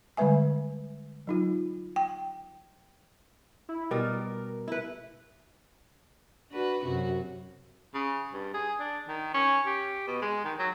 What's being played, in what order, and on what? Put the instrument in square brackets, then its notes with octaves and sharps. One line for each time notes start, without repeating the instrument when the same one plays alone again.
[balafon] D3 G3 G#3 B4 E5 G#5
F#3 D#4 F4
G5
[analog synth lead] E4
[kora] B2 G3 [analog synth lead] A#4
[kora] E4 B4
[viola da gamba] D4 F#4 B4
F#2 C3 F#4
[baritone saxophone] C#3
G2
G#4
D4
D#3
C#4
G4
B2
G#3
D#3
F#3